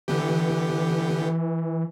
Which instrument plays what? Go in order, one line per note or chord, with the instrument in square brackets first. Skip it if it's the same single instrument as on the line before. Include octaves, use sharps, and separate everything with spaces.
[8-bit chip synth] D3 B3 G4 [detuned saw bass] E3